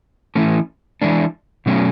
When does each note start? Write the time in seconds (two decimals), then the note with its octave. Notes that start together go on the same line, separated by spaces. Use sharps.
0.35 E3 A3 C#4
1.02 E3 G#3 D4
1.66 B2 F#3 A3 C#4